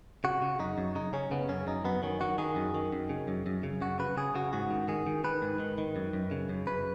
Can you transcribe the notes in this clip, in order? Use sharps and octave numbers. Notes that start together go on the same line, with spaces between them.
C#3 F#4
C#3
F#2 D#4
F#2
C#3 D#4
C#3 C#4
C#3 B3
F#2 C#4
F#2 D#4
F#2 B3
D#3 C#4
D#3 F#4
D#3 G#4
F#2
D#3
F#2
C#3
F#2
F#2
C#3
F#2 F#4
C#3 B4
C#3 G#4
C#3 F#4
G#2 F#4
D#3
D#3 G#4
D#3
D#3 B4
G#2
D#3
D#3
F#2
F#2
C#3
F#2
F#2 B4